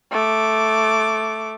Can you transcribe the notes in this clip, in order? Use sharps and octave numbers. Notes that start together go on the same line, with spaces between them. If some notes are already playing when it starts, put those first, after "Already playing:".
A3 D6